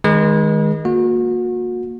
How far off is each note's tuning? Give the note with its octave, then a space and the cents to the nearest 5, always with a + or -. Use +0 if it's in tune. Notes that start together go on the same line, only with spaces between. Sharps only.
D#3 +0 G#3 +0 B4 -45
A#3 +0 F#4 -35